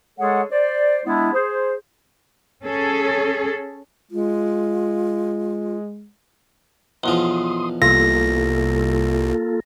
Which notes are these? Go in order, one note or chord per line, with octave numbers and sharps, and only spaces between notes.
G#3 G#4 A4 C#5 F#5
C5 D5
G#3 B3 D4 E4
G#4 C5
C#4 G#4 A4
G#3 F4
B1 E2 F3 C6 D#6
C2 A#3 F4 A4 A#6